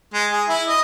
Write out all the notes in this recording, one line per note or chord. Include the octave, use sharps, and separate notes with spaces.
G#3
G#4
E4
D#5